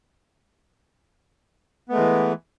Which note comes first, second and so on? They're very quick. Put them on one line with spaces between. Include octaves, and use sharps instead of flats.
B3 A3 G#3 E3